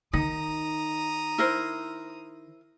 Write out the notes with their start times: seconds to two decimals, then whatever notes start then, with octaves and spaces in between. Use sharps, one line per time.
0.13 D#3 D#4 A#5 D#6
1.38 E4 A#4 C5